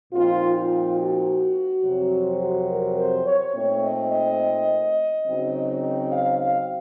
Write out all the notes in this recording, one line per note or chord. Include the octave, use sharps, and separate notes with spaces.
A#2 F3 C4 D#4 F4
F4
F#4
F2 C3 F#3 C4
A#4
C5
C#5
A#2 A3 C4 D#4 C#5
D#5
D#5
C#3 F#3 C4 D#4
F5
F5